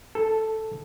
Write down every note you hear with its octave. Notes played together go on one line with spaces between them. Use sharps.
A4